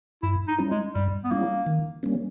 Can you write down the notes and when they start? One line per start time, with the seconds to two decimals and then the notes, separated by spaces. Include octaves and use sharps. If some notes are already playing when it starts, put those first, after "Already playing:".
0.23 G2 E4
0.48 D#4
0.58 G3 C#4 E4
0.71 G#3
0.94 G2 G3
1.24 B3
1.31 G3 A#3 C#4 E4
1.66 D#3
2.03 G3 A#3 C#4